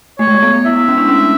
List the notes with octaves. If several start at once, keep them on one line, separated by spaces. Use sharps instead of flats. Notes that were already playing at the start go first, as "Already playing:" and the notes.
A3 C#5
G#3
A3
B3
E4 E5
C#4
D4
C#4